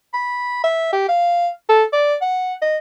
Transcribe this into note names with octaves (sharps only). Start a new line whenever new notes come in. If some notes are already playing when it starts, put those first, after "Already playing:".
B5
E5
G4
F5
A4
D5
F#5
D#5